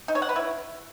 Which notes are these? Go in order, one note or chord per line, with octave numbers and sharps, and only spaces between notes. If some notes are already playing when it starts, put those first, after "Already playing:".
D#4
C#5
F#5
B4
E4